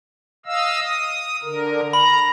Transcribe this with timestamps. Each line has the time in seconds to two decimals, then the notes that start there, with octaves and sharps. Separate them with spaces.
0.46 D#5 F5 E6
0.80 D#6
1.43 D3 A#4
1.93 A#5 B5